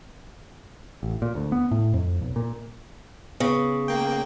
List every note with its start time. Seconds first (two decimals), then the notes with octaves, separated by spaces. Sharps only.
1.03 A1
1.22 A#2
1.35 D2
1.52 B3
1.71 A2
1.94 F2
2.22 B1
2.36 A#2
3.40 C#3 B3
3.88 A#3 G5